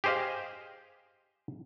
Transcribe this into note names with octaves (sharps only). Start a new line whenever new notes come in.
G4 G#4 C5 D#5 F5